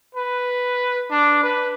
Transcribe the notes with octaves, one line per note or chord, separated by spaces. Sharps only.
B4
D4
B4